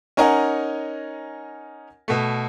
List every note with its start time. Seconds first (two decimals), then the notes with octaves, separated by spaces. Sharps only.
0.17 C#4 D#4 A#4 D#5 F#5 G#5
2.08 B2 A3